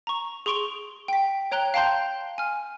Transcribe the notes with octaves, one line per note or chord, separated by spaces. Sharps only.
A#5 C#6
G#4 C6 C#6 D7 F7 G7
G5 B6
C#5 G5 A#5 F#6 G7
F5 G5 A5 A#5 C6 G6
G#5 F6